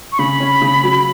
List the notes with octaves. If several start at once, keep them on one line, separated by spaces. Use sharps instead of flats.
C#6
C#3 B5
C#4
C#3
F#3